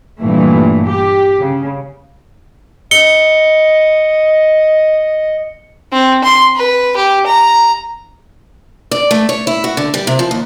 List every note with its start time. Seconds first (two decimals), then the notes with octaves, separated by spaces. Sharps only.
0.21 G2 A#2 E3 A3
0.88 G4
1.40 C#3
2.91 D#5 C#7 G7
5.93 C4
6.24 C6
6.56 B4
6.96 G4
7.26 A#5
8.91 D5
9.11 A3
9.29 C#5
9.47 E4
9.64 F#4
9.77 D3
9.94 G3
10.07 C3
10.19 F3
10.31 D#2